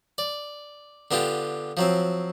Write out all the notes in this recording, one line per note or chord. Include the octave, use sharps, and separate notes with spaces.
D5
D3 B3 F4 G4
F3 F#3 C4